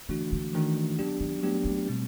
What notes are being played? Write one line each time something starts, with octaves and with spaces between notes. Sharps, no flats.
D3 E3 A3 D4 F#4
D3
D#3 E3 A3 D4 F#4
D3 F#3 B3 D4 G4
D#3
F#3 A3 B3 D4 G4
A3
B2 G3 C4